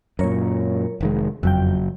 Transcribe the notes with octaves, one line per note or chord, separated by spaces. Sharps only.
F#2 A#2 A#4 C#5
F1 D#3 G#3
F#1 F2 F#3 G5